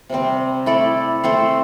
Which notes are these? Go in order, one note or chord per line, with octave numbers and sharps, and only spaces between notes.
C3 G3 C4
A3 E4 A4 D5
A3 C4 A4 C5